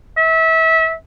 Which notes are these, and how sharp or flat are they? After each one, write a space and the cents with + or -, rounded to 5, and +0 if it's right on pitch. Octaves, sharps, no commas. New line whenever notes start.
E5 -25